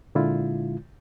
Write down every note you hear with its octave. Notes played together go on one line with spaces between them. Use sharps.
A#2 D3 G#3 E4 F4